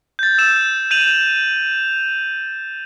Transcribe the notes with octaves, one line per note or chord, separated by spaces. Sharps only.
G6 A6
E6 E7
G6 D#7 F7 F#7